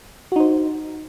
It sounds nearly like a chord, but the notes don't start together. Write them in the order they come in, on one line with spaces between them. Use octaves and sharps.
F#4 D#4 C5